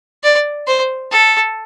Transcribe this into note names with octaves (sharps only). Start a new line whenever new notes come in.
D5
C5
A4